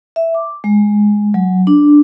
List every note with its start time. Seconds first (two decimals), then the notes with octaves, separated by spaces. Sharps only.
0.16 E5
0.34 D6
0.64 G#3
1.34 F#3
1.67 D4